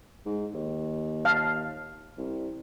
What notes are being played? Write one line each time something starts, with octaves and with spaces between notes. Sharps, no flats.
G#2
D#2
F5 A5
C2